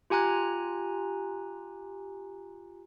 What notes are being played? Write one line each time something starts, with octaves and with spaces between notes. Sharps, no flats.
F4 G4 G#5 A#5 F#6